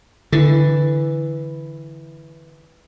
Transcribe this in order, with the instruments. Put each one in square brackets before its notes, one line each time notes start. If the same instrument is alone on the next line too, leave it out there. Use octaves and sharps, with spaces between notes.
[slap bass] D3 [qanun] E3